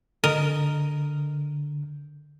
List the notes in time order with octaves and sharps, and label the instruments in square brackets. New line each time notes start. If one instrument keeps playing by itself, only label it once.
[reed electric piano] D3 [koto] A#4 D#5